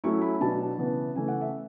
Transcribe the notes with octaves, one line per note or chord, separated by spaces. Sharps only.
F#3 A3 C#4 E4 C#6
B5
B2 F#3 B3 D4 A5
C#3 E3 B3
C#3 E3 A3 G#5
F#5
E5